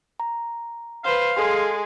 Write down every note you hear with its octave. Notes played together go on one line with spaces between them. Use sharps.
A#5
B4 C5 F5
G#3 G#4 A4 C6